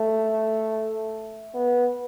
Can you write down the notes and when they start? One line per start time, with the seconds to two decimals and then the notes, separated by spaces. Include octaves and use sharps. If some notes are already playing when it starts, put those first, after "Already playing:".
Already playing: A3
1.54 B3